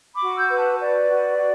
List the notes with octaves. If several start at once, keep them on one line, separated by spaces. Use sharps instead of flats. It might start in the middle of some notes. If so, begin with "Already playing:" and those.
B5 D6
F#4
E6 G6
B4
F#5 A5
B4 D5
F#4
F#4